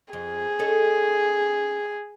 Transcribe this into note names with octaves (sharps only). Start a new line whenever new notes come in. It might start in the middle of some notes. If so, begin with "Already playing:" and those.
F2 G#4
C#4 D#4 A4